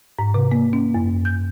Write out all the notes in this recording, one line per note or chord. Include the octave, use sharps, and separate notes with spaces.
G#2
C3
A#3
C#4
F#2
G6